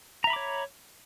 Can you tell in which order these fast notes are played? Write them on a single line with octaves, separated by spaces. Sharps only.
A#5 E5 B5 D6 C#5